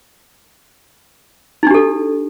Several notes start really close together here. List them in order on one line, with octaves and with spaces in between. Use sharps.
D#4 D4 G4 A4